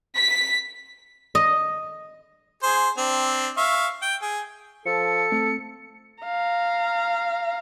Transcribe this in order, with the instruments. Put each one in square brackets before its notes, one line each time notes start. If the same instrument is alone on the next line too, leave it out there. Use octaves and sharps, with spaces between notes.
[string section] B6
[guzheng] D#5
[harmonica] G#4 C5
C4 D4
E5 F5 C#6
G5
G#4
[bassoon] F3 [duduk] A4 [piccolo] C#7
[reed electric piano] A3 C4
[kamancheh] F5 A#5